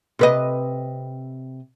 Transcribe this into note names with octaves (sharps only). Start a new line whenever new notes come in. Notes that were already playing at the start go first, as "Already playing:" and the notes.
C3 B4 D#5